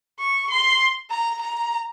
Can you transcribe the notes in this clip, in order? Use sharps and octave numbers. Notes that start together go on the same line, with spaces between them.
C#6
C6
A#5
A#5